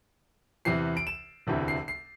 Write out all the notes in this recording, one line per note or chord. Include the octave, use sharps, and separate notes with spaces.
E2 C3 E3 C7
D7
E7
E1 D2 C3 E3
C7
C7